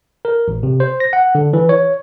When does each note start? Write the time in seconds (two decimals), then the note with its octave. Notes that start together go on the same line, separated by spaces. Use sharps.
0.25 A#4
0.48 A1
0.63 C3
0.80 C5
1.00 A#6
1.13 F#5
1.35 D3
1.53 E3
1.69 C#5